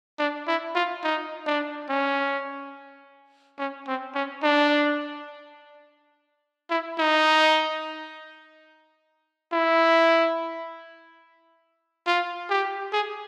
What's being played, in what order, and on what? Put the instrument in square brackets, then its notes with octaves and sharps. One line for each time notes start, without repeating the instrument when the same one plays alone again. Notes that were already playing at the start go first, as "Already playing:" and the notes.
[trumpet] D4
E4
F4
D#4
D4
C#4
C#4
C4
C#4
D4
E4
D#4
E4
F4
G4
G#4